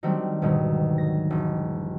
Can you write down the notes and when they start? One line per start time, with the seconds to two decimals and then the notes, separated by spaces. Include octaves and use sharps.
0.03 D#3 F#3 G3 A3 C4 D4
0.42 D2 G#2 B2 D#3 F#3 G3
0.98 A#6
1.30 E1